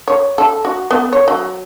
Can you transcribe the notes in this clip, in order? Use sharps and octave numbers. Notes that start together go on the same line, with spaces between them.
C#5
A4
F#4
B3
C#5
F#3